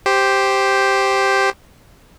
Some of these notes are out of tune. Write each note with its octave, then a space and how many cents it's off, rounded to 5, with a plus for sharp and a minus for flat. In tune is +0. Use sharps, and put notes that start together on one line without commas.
G4 +0 C5 +0